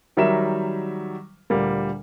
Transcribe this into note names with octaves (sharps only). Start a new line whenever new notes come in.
D#3 F#3 G3 A#4 E5 E7
D2 A#2 G3 A#3